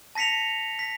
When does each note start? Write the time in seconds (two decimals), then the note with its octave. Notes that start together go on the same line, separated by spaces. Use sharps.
0.15 A5 A#6 B6 C#7 F7
0.79 B6